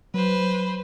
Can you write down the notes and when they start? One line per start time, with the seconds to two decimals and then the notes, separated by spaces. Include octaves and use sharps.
0.14 F#3 B4 C5